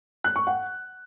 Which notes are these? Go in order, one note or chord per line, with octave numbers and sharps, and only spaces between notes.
F#6
C#6
F#5